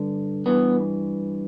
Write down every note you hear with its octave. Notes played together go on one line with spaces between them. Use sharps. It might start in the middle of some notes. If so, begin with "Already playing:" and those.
Already playing: G2 D3
G2 E3 B3